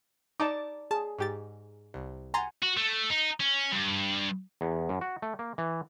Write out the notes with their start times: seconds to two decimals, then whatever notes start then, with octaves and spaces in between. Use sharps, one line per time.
0.40 D#4 D5 A5 D6
0.91 G#4 A5
1.18 G#2 G4 A6
1.94 C2
2.34 F#5 G#5 A#5 C6 A6
2.62 F#4
2.77 A3
3.10 D#4
3.40 C#4
3.72 G2
4.61 E2
4.89 F#2
5.01 F#4
5.22 A3
5.39 A#3
5.58 E3